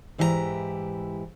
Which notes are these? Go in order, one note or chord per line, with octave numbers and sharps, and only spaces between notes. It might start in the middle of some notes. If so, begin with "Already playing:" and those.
G#2 E3 E4 G4 C5 A#5